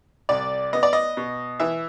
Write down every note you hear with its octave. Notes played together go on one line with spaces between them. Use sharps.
C2 D5
B3 D#5
D5
D#5
B2
E3 E5